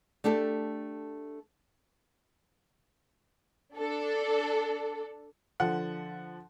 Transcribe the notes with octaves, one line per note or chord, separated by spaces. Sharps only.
A3 D4 G4 A4
D4 A4
D3 F3 F#5